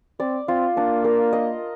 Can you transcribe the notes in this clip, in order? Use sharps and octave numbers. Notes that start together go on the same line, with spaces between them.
C4 D5
C4 F4
A#3 D4
A#4
D#5